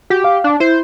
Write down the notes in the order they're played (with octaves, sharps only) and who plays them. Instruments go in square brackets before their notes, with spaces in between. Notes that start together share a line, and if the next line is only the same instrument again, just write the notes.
[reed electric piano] F#4 [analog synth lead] G4
[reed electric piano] F5
[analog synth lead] D4
[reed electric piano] E4 [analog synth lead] C5